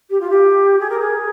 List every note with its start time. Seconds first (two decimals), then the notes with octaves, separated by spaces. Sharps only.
0.10 G4
0.20 F4
0.30 G4
0.79 G#4
0.89 A#4
0.99 G#4